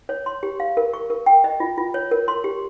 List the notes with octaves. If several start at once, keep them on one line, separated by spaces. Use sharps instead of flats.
C#5
C6
G4
F5
A#4
C#6
A#4
G5
D#5
F4
F4
C#5
A#4
C6
G4